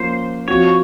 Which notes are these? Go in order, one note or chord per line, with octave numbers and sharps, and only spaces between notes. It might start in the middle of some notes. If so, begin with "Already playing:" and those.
Already playing: F3 A#3 C#4 F4 C5
F3 C4 F#4 C#5